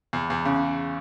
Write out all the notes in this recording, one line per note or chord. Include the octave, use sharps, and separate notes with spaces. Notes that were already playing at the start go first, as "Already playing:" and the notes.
E2
E2
C#3